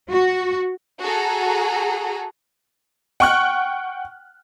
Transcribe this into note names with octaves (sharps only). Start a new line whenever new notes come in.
F#4
F#4 G#4 A4 A#5
F#5 G5 C#6 F6 F#6